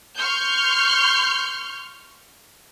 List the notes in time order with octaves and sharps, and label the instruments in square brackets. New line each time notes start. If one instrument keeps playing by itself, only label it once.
[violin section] C6 C#6 F6 G6